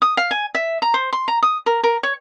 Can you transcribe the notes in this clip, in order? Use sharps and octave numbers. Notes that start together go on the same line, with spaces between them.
D#6
F5
G#5
E5
A#5
C5
C6
A#5
D#6
A#4
A#4
C#5